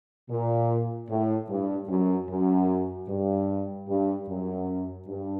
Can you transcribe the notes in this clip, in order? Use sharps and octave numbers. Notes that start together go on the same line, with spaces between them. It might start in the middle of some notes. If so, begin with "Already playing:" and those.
A#2
A2
G2
F#2
F#2
G2
G2
F#2
G2